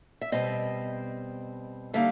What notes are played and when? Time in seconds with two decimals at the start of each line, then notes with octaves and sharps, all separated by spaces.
0.21 E5
0.32 B2 G3 C4 D#5
1.93 D3 G3 A#3 D#4 E5